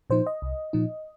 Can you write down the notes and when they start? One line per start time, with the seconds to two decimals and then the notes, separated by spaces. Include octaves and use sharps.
0.10 A#2 F3 D#4 C5
0.27 D#5
0.42 C2
0.73 A#2 F3 D#4